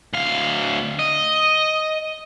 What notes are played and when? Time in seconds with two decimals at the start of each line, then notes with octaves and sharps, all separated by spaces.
0.13 D2 F5
0.99 D#5